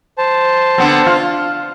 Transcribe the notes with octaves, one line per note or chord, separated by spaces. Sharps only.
C5 A5
D3 B3 C4
F4